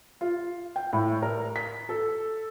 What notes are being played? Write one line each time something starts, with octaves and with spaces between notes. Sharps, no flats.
F4
G5
A2
A#4
B6
A4